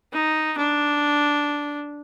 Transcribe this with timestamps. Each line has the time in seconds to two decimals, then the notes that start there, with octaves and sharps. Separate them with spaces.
0.13 D#4
0.58 D4